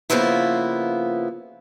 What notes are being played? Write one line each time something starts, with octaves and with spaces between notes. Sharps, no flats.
C#3 F3 A#3 B3 E4 F4